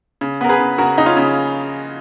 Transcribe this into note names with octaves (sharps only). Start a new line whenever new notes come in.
C#3
B3 A#4
G#4 B4
C#3
C#3 F#4 A#4
C#3 D#4
C#4 F4
C#3